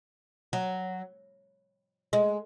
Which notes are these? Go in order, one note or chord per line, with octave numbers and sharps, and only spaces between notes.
F#3
G#3